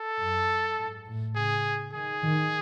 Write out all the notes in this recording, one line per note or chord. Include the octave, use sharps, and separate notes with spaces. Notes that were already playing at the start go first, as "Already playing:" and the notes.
Already playing: A4
F#2
G#2
A2
C#3 G#4
D#3 G#4
D#3